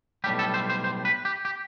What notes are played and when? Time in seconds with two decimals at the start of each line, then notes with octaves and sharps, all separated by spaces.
0.24 B1 A2 G3 G4
0.39 A4
0.54 C5
0.70 C5
0.84 C5
1.05 B4
1.25 G4
1.45 G4